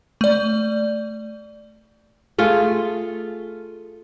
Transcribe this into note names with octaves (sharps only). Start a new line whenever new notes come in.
A3 D5
A3 F4 G#4